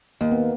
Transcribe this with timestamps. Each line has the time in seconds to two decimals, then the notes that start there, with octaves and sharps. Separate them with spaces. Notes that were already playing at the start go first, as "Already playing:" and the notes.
0.21 D#2 A#3
0.32 B3